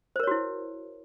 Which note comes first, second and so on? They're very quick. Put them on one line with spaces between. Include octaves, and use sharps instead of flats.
C5 A#4 C#5 F#4 E4